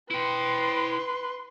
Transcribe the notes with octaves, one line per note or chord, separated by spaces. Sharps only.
E4 B4 G5 C6